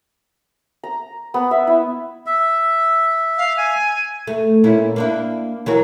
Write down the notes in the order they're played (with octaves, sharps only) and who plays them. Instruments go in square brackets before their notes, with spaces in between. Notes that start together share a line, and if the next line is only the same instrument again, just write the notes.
[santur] A#5
B3
E5
E4
[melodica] E5
[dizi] F5
G#5
[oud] A3
A#2 C#4 E4
A#3 D4 E4
E3 F#3 A#4